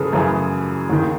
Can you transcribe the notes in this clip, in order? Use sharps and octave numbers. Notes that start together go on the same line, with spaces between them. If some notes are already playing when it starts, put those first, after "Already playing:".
Already playing: F#2 C#3 E3 G#4 A4 B4
F#2 C#3 E3
D#2 D#3